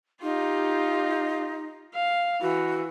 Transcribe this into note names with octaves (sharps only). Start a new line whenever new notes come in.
D#4 F4 G4
F5
E3 F#4